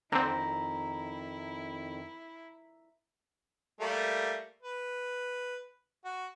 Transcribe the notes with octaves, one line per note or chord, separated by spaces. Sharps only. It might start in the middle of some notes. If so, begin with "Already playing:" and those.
F2 D3 D#3 C4 E4 A#5
G3 A3 A#3
B4
F#4